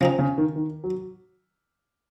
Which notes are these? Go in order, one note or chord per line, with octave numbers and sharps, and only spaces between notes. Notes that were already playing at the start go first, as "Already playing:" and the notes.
C#3 F3 C4 D#4
C#3
D#3
D#3
F#3